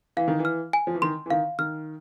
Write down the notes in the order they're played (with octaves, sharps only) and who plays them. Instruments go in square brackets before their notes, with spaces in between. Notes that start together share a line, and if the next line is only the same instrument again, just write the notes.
[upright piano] E3 [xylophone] F5
[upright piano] D#3
E3
[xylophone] F6
G#5
[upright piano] F3
E3
[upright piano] D#3 [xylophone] C6
[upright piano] E3
[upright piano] D#3 [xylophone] F5
[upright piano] D#3 [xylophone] F6